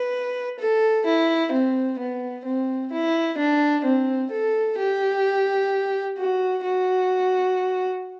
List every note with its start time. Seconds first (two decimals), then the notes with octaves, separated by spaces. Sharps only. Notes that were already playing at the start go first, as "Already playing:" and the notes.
Already playing: B4
0.59 A4
1.06 E4
1.52 C4
1.99 B3
2.46 C4
2.92 E4
3.38 D4
3.85 C4
4.31 A4
4.78 G4
6.17 F#4
6.64 F#4